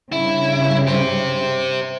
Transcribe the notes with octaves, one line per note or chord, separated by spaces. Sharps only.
G2 C#3 E4
G4 C5